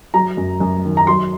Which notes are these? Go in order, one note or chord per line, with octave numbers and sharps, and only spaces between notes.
F#3 A#5
F#2
F#2
D#3
A#5
F#3 C6